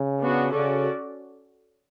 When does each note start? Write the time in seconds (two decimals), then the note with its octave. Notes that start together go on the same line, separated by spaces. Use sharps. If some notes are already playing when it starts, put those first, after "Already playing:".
Already playing: C#3
0.22 B3 D4 F#4
0.53 C#3 C#4 F#4 A4 D5